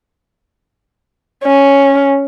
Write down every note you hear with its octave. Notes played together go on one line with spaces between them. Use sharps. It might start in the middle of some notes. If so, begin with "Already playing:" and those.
C#4